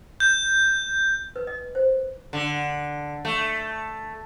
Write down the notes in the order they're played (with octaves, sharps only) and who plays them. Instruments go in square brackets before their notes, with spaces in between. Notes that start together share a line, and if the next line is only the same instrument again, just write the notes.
[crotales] G6
[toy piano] B4
D#5
C5
[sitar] D3
A3